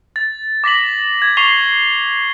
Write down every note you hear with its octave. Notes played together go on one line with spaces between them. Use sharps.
A6
D6 A#6 B6 F#7
G#6
C#6 C7 F7 G7